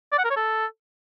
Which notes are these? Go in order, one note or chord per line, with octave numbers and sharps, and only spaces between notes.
D5
F#5
A#4
C#5
A4